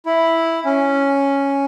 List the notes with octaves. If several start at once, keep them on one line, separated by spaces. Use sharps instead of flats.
E4
C#4